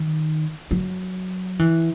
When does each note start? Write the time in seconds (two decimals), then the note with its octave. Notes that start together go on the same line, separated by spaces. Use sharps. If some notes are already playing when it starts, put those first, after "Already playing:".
Already playing: D#3
0.71 F#3
1.59 E3